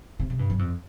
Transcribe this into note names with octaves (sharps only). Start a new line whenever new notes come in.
C3
C3
G2
F#2
F2